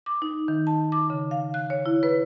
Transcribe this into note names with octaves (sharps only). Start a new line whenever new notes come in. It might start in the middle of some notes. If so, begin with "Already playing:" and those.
D6
D#4
D#3
A5
D6
C#3
F5
F#6
C#5
E4
B4